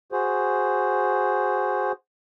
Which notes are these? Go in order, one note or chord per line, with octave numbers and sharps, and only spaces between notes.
F#4 G#4 C5